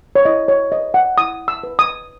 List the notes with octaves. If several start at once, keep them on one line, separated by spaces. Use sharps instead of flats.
C#5
E4 D#5
C#5
B4 D#5
F#5
E4 D#6
E6
B4
D#6